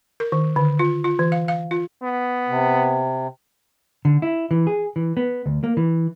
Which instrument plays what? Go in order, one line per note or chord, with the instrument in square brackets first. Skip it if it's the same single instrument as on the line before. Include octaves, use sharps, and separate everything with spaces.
[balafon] A#4
D#3
D3
F4
F4
E3
F5
F5
F4
[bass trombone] B3
[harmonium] C3
[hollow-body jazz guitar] D3
E4
E3
G#4
E3
B3
D2
A#3
E3